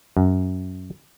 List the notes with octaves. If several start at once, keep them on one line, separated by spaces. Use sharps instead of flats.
F#2